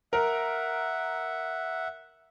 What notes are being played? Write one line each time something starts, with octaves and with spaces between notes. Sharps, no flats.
A#4 E5 F#5